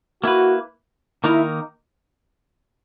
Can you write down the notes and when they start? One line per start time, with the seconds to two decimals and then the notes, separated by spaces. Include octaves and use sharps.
0.23 A#3 E4 F#4 B4
1.24 D#3 A#3 D#4 E4 A#4